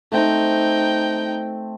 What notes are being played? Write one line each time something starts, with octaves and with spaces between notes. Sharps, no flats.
A3 C4 D#4 G5